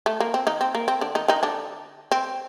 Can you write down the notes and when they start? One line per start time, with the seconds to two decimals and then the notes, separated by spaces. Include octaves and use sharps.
0.06 A3
0.20 A#3
0.34 C4
0.47 D#3 D#4
0.61 C4
0.75 A#3
0.88 C4
1.01 D3 D4
1.15 D#3 D#4
1.28 D#3 D#4
1.43 D3 D4
2.12 C4